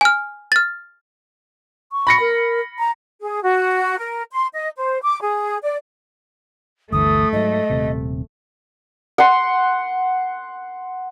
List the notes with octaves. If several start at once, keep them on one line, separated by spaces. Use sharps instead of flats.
G#5 F6
F6 A6
C#6
B5 A#6 C#7
A#4
A#5
G#4
F#4
A#4
C6
D#5
C5
D6
G#4
D5
G1 D2 E3 A3 D#6
G#2 F#3 D#5
D#1 C3
F#5 C6